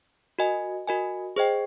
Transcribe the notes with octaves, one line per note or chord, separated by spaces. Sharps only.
F#4 A#4 D#5 G#5
F#4 A#4 D#5 G#5
G#4 C5 D#5 G5